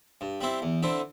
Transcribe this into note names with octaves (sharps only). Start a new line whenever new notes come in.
G2
G3 C4 E4
E2
D3 C4 E4